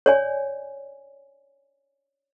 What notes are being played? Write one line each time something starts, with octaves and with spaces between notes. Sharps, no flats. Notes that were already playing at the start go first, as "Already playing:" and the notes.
C#5 D5 G#5